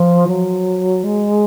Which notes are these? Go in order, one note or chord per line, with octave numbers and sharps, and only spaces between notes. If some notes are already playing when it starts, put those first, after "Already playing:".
Already playing: F3
F#3
G#3